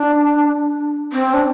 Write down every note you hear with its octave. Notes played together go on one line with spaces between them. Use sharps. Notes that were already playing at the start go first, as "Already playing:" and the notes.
Already playing: D4
C4
D4